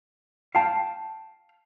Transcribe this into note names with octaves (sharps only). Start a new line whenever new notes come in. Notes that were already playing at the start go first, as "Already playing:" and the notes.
F5 G5 A5